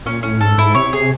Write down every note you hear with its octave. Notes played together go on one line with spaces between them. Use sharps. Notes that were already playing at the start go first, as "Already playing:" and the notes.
A#2 C#4
A2 C#4
G#2 A4
G#2 E4
C3 C#5
C3 G#4